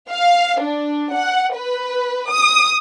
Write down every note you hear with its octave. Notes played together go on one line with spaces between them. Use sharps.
F5
D4
F#5
B4
D#6